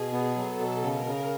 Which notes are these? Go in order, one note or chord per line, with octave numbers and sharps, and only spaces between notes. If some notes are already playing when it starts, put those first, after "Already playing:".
Already playing: B2 G#4
B3
F#3 A4
B2
C#3 A#4
C#3